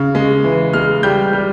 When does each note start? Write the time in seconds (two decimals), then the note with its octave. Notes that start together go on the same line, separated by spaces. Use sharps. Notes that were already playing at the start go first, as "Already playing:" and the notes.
Already playing: C#3
0.15 G#3
0.44 E3
0.73 G#3 F6
1.03 G3 G6
1.33 G3